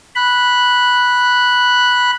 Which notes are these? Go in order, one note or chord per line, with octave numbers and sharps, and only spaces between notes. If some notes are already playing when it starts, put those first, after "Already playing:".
B5 F#6